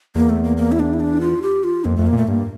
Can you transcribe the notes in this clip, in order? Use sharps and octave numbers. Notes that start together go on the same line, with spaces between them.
E2 A#3
A3
A#3
A#3
E4
D4
E4
D4
F4
G4
F4
F2 A#3
F2 A3
A#3
A#2 A3
G2 A#3